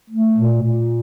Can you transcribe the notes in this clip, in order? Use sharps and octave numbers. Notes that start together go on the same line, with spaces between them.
A3
A#2
A#2